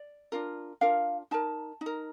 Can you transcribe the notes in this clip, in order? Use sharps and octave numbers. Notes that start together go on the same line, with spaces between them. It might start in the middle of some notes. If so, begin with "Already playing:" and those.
Already playing: D5
D4 F4 A#4
D4 F4 A#4 F5
D#4 A#4 A5
D#4
A#4